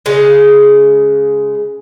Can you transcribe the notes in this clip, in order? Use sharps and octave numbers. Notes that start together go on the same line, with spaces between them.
C#3 G#3